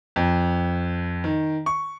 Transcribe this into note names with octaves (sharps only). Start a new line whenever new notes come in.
F2
D#3
C#6